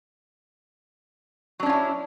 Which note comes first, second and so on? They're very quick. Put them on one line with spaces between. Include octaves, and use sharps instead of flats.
F#3 D4 C#4 F4 E4